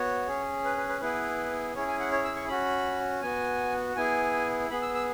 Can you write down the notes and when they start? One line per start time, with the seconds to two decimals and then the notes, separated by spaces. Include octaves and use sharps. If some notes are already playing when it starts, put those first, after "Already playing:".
Already playing: B3 F#4 C#5
0.27 C#4 G#4
0.64 B4
0.77 B4
0.89 B4
1.01 B3 E4 G#4 B4
1.75 C#4 E4 G#4 C#5
1.88 G#5
2.00 F#5
2.12 C#5
2.24 E6
2.36 C#6
2.48 C#4 F#4 B5
3.22 B3 F#4 G#5
3.96 B3 E4 G#4 G#5
4.70 B3 G#4 B5
4.82 E6
4.94 E6